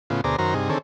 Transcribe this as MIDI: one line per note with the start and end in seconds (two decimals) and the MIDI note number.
0.10 0.21 45
0.10 0.21 49
0.10 0.21 59
0.10 0.21 65
0.24 0.36 38
0.24 0.36 47
0.24 0.36 68
0.24 0.36 72
0.24 0.36 74
0.24 0.36 82
0.39 0.54 42
0.39 0.54 51
0.39 0.54 66
0.39 0.54 70
0.39 0.54 72
0.39 0.54 82
0.54 0.69 43
0.54 0.69 48
0.54 0.69 63
0.54 0.69 68
0.70 0.78 50
0.70 0.78 51
0.70 0.78 60
0.70 0.78 68
0.70 0.78 69
0.70 0.78 73